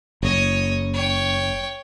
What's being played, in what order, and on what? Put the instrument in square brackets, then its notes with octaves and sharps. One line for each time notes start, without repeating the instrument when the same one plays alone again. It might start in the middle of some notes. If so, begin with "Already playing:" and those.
[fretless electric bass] F#1 [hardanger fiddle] C#5 D#5
[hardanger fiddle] C#5 G5